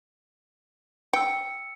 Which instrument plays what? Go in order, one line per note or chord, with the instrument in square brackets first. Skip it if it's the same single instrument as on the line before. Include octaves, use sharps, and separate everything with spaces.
[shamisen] G5 [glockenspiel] E6 C#7